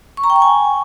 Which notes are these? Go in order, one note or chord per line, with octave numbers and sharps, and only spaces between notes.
C#6
A#5
G5
C#6
G#5